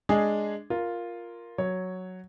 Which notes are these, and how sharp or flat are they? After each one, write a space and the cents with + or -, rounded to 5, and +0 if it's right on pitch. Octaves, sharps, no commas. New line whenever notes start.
G#3 +0 D4 +0 G#4 +0
F4 +0 A#4 +0
F#3 +0 C#5 +0